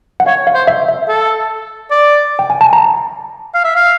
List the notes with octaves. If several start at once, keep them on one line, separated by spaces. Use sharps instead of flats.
F#5
C#5 F5
F5
C5
E5
E5
A4
D5
G5
G#5
A5
A#5
F5
E5
F5